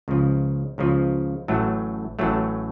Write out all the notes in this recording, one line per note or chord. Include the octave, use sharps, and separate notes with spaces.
C#2 C#3 F3
C#2 C#3 F3
A1 A2 F#3 A3
A1 A2 F#3 A3